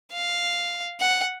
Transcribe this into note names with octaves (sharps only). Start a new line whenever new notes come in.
F5
F#5